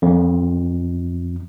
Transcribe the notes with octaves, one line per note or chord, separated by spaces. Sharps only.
F2